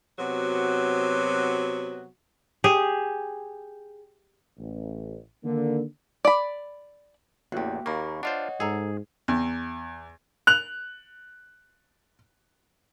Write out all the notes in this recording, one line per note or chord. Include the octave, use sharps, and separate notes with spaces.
C3 F#3 B3 F#4
G4 G#4
A1
D3 D#3 A#3
D5 B5
A1 E2 A#3 F#4 G4
D#2 A#3 B5 C#6
D4 F4 C5 C#5 D#5 F#5
G#2 G#4 A4 A#5
E2
F#6 F7